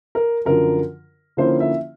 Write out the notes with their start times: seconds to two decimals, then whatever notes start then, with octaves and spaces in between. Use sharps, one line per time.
0.15 A#4
0.45 F#2 D3 F3 A#4
1.37 D3 F3 A#3 C#4 E4 C5
1.60 E5